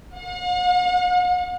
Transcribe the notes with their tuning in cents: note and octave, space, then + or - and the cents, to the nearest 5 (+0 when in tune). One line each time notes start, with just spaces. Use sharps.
F#5 -45